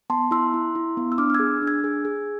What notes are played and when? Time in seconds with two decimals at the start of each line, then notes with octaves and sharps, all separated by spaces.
0.10 B3 A5 C6
0.31 E4 C6 E6
0.54 E4
0.75 E4
0.97 B3
1.12 E6
1.18 D4 D6 F6
1.30 F6
1.35 G#4 E6 G#6
1.62 D4
1.67 E6 G#6
1.84 G#4
2.05 G#4